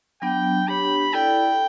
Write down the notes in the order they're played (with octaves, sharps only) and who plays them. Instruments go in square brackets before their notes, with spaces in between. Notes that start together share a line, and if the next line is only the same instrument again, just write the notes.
[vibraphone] F#3 B3 D4 [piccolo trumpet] G5
[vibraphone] D4 G4 C#5 [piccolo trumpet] B5
[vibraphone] E4 A4 D5 [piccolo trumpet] G5